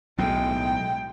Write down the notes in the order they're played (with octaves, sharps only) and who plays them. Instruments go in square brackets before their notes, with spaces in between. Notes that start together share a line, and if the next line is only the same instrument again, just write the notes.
[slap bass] B1 A2 [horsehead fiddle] G#3 G5